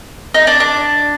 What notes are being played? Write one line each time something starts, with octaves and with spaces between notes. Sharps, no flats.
D#4
D4
D4